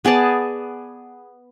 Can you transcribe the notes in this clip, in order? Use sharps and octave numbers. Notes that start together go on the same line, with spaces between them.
B3 G#4 D5 A5